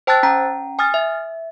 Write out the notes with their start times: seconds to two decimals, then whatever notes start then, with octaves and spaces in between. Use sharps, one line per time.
0.07 C5 G5 A5 E6 F#6 A6
0.23 C#4 G5 A#5
0.79 G#5 D#6 F6 A6
0.94 E5